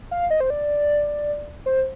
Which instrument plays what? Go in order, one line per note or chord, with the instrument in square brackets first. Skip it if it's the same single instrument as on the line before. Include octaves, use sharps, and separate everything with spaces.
[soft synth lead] F5
D#5
C5
D5
C5